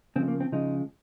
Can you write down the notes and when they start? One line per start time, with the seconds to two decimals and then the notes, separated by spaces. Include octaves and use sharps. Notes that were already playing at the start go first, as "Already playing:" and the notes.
0.16 C#3 F3 G#3 C4
0.28 A#3
0.40 C4
0.52 C#3 F3 G#3 D#4